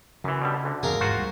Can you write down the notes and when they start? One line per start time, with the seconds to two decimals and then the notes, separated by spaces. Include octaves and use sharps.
0.24 F#2 C#3 E3
0.42 B2 D3 G3
0.64 D2 D3
0.83 E2 G2 C3 G#4 A#4 F5
1.01 D1 G#2 F4 F#4 C5
1.16 D2 G3